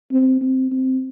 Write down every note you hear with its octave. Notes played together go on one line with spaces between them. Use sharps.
C4
C4
C4